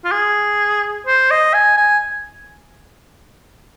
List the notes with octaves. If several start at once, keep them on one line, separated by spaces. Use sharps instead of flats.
F4
G#4
C5
D#5
G#5
G#5